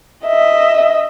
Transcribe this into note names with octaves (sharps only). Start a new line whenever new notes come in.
D#5 E5